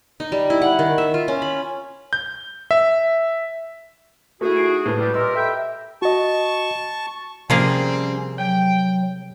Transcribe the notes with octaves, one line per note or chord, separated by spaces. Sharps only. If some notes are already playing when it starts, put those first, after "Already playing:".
D#4
G3
E4
F#5
D#3
E5
F4
C#4
B5
G6
E5
A3 E4 F#4 G#4
D#4 C7 D7
A2 G4 A4 B4
G3 B4
A#2 G4 A#4 B4 D#5 C6 E6
A4 E5 G5 B5
F#4 D#5 A5 C#6
C3 F3 G3 A#3 C4 C#4 G#4
F#3 G5